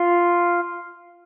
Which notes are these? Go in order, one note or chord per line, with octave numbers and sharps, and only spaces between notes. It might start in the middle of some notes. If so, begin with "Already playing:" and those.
Already playing: F4